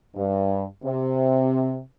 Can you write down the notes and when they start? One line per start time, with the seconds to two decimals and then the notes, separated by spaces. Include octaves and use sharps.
0.15 G2
0.84 C3